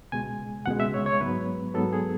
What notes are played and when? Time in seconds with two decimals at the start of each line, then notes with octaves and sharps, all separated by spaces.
0.12 C#2 B2 G#3 G#5
0.66 C#2 B2 G#3 F#5
0.80 E5
0.94 C#5
1.06 C#5
1.20 G#2 F#3 B3 B4
1.74 G#2 F#3 B3 A4
1.93 G#4